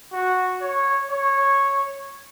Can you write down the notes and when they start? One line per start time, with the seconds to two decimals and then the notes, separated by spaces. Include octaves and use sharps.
0.13 F#4
0.61 C#5
1.10 C#5